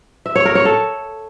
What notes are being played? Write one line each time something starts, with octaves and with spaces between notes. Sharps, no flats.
E5
C#5
A#4
C#5
A4